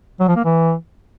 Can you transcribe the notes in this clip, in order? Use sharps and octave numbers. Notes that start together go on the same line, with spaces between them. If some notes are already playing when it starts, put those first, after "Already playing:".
F#3
F3
A#3
E3